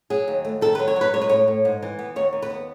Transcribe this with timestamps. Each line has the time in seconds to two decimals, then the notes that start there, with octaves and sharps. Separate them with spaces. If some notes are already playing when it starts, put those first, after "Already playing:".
0.10 F#3 G#4
0.28 D#2
0.45 A3
0.61 D#3 A4
0.75 F#3 B4
0.88 C#5
0.96 F#3
1.01 B4
1.13 G#3 C#5
1.21 B4
1.29 A2 C#5
1.47 A2
1.65 G#2
1.82 E3
1.99 B3
2.16 D#2 C#5
2.33 D#2
2.42 B4
2.50 B3